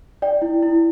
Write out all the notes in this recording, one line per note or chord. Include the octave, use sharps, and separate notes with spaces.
D5 G5
E4
E4